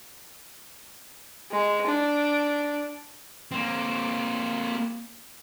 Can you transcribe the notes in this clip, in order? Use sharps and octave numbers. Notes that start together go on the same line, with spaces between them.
G#3
D4
A#3 C4